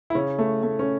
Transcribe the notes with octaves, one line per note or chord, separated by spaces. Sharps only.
E4
C#3 C#4
A3
A3
C#4